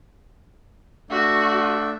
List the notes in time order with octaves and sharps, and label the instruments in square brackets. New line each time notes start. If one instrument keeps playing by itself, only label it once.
[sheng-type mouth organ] A3 D4 E5 [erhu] F#4